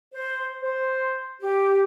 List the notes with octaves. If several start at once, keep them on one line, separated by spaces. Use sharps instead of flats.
C5
C5 C6
G4